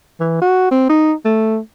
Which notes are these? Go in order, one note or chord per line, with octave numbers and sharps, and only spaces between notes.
E3
F#4
C4
D#4
A3